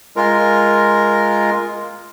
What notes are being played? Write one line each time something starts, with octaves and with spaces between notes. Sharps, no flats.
G#3 F4 A#4